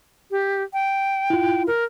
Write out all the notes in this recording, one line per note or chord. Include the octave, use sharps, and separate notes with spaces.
G4
G5
E4 F4
A#4